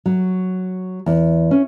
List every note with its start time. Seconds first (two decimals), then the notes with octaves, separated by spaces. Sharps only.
0.06 F#3
1.06 E2
1.51 C#4